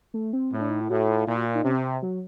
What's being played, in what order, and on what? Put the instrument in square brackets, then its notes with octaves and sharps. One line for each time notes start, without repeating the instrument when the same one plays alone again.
[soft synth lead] A3
C4
[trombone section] A2
[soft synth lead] D4
D#4
E4
[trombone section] A2 [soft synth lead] F#4
[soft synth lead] F4
[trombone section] A#2 [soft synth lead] E4
[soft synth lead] F#4
F4
D#4
[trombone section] C3 [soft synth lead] C#4
[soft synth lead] C4
F#3